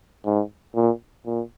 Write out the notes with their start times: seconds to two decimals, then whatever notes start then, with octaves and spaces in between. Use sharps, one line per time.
0.26 G#2
0.75 A#2
1.26 A#2